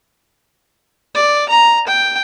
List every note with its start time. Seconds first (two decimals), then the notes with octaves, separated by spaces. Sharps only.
1.15 D5
1.49 A#5
1.87 G5